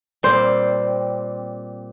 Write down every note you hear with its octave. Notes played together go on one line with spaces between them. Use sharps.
A#2 G3 C4 C5